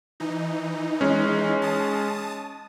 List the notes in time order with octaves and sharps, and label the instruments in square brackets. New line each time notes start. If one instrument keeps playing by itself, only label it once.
[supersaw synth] E3 D#4
[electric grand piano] G#3 C#4
[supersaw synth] A5 D#6